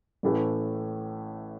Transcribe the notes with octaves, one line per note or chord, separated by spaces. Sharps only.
A1 A2 E3 A3